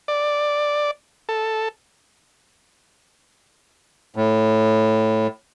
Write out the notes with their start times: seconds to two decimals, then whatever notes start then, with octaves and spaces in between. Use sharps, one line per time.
0.08 D5
1.29 A4
4.16 A2